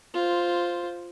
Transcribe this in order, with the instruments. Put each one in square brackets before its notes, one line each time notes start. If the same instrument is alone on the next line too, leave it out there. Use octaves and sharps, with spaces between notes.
[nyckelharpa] F4 C5